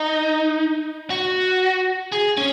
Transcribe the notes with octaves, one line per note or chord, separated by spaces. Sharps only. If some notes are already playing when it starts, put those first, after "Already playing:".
Already playing: D#4
F#4
G#4
C#4